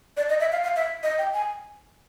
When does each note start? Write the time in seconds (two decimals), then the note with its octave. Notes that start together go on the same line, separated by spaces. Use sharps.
0.17 D5
0.29 D#5
0.40 E5
0.52 F5
0.63 F5
0.76 E5
1.03 D#5
1.19 G5
1.33 G#5